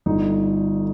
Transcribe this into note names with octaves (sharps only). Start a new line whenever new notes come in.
G1 G2 D3 G3 D#4